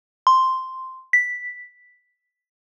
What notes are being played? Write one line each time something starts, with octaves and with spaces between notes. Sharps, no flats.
C6
B6